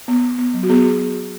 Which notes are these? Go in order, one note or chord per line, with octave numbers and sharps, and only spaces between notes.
B3
B3
B3
F#3
F#4
B3 G#4